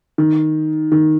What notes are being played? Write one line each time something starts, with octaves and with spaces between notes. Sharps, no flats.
D#3
D#3